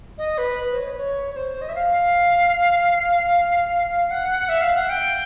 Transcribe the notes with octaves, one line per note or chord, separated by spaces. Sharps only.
D#5
B4
C5
C#5
C#5
C#5
C5
D#5
E5
F5
F#5
E5
F5
F#5
G5